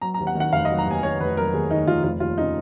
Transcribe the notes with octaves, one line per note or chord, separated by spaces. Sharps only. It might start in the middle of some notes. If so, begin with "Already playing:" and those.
F#3 A#5
A#5
D#2
F#5
D#3
F#5
F1 F5
D#5
F#3
A#5
D#2 G#5
D#3 C#5
F1 B4
F#3 A#4
D#2 G#4
D#3 D#4
F1 F4
F1 F4
D#2 F4
C#3 D#4